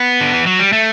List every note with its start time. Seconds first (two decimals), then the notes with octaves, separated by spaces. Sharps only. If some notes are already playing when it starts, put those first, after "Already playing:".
Already playing: B3
0.20 D3
0.34 E3
0.47 F#3
0.59 G3
0.73 A3